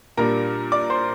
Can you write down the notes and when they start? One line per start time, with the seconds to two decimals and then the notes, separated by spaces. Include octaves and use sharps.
0.17 A#2 G3 A#3 D4 A#4 A#5
0.72 D5 D6
0.90 C5 C6